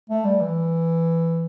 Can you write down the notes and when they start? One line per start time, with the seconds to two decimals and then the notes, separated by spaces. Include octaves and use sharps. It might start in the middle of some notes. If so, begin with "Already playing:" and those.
0.10 A3
0.24 G3
0.41 E3